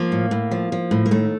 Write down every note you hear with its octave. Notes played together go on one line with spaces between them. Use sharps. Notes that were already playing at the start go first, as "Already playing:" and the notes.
Already playing: F3 A#3
A2
A2
F3
F3
A2
A#3
D#2 A3